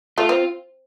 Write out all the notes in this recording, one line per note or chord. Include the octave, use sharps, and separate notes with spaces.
A3 F4
C4